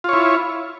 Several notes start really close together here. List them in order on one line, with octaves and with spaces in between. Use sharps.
F4 C#5 E4